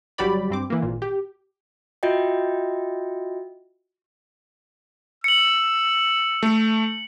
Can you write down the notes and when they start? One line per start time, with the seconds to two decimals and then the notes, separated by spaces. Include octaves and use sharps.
0.18 G1 F#3 G3 G4 D5 B5
0.50 G2 C4 D6
0.70 E3 A#3
0.82 G#1 A#2
1.02 G4
2.03 F4 F#4 D#5 E5 G5
5.24 E6 C#7 F#7
6.43 A3